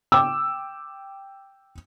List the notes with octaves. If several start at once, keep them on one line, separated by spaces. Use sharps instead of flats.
G5 D6 E6